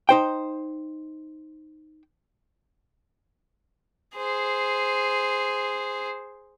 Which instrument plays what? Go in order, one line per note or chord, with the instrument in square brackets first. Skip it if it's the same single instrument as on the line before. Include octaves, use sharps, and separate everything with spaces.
[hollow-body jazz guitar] D#4 C5 G5
[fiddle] G#4 C5